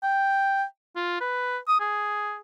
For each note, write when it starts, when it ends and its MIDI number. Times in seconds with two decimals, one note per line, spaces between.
0.03 0.64 79
0.96 1.19 65
1.21 1.58 71
1.68 1.77 87
1.80 2.38 68